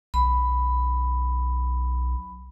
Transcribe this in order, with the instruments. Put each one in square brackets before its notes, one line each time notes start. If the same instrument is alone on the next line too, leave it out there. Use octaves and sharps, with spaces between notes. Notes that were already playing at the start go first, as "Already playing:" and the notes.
[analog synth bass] B1 [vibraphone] B5